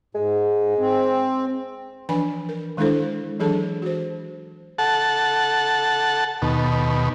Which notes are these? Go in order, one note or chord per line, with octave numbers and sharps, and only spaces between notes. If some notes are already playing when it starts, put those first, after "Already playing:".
G#2 G#3
C4
E3 F3 D4 B4 G#5 B5
A#4
D#3 G#3 D4 E4 A4 C5
E3 F#3 D4 G#4 A4 A5
F#4 C5
A4 F#5 A5
D#2 B2